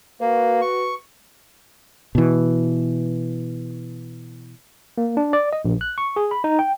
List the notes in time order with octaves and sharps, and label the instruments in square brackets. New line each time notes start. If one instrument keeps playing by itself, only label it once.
[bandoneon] A#3 [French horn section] F#4 B4
[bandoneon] C#6
[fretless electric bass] B2 E3
[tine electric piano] A#3
D4
D5
D#5
A#1
F#6
C#6
G#4
B5
D#4
G5